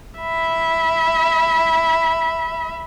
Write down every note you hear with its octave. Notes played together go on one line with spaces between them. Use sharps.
E5 B5